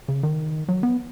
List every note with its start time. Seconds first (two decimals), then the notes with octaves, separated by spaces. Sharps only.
0.08 C#3
0.23 D#3
0.69 F#3
0.83 B3